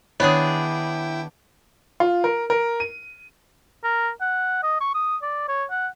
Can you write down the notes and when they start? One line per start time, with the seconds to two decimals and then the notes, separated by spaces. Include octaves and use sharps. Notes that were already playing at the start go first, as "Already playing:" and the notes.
0.20 D#3 B3 D4 E4 G#4 C#5 G5 D#6
2.00 F4
2.24 A#4
2.50 A#4
2.80 D#7
3.84 A#4
4.21 F#5
4.63 D#5
4.81 C#6
4.95 D#6
5.22 D5
5.48 C#5
5.70 F#5